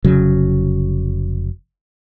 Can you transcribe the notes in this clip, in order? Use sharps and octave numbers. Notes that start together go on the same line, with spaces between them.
F1 C#3 F#3